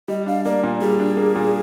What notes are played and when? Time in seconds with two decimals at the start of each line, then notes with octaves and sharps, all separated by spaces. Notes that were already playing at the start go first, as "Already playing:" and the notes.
0.08 G3 D#5
0.26 D4 F5
0.45 A#3 D5
0.64 A#2
0.81 G3 G#4
1.00 D4
1.17 A#3
1.36 A#2